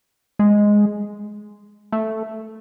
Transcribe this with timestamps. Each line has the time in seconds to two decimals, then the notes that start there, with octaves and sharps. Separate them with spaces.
0.39 G#3
1.92 A3